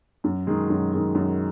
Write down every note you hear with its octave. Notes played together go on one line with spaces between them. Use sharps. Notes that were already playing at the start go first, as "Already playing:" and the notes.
F#2
D#3 G#3
F#2
D#3 G#3
F#2